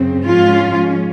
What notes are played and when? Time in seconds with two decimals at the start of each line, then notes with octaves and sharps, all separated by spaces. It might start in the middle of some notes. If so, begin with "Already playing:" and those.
Already playing: F#2 C#3 C4
0.25 G#2 F3 G#3 C#4 F4